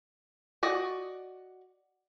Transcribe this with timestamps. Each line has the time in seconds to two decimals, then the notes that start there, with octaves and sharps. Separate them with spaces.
0.63 F#4 D5 D#5